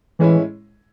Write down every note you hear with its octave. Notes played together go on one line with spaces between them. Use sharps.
A2 E3 G#3 C#4 E4